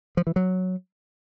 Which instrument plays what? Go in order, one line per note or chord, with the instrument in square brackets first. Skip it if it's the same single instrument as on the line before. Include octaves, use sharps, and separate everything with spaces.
[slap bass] F3
E3
F#3